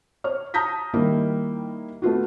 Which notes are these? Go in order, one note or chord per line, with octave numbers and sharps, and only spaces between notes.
C5 C#5 F6
A5 A#5 D#6 G6 A#6 B6
D#3 G3 A#3 D#4 E4
A3 B3 F4 F#4